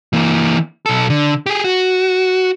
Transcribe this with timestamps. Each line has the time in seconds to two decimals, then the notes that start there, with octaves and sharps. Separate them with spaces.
0.13 E3 A#3
0.86 B1 A4
1.10 D3
1.46 G4 G#4
1.64 F#4